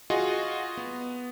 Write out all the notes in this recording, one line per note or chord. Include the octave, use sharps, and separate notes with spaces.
F4 F#4 G#4 D#5
B3